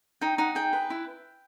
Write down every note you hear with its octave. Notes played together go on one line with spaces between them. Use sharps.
D#4 G5
D#4 F#5
G#4 G5
B4
E4